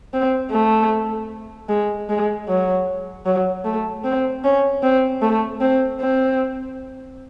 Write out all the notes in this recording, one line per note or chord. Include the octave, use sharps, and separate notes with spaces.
C4
A3
G#3
G#3
F#3
F#3
A3
C4
C#4
C4
A3
C4
C4